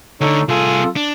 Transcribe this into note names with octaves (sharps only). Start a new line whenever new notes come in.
D2 D3 D#4 A4 C#5
C2 F4 G#4 A4
D4